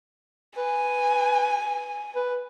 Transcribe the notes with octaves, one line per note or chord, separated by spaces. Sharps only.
B4 G#5
B4